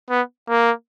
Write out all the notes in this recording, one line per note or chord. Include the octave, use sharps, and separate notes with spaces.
B3
A#3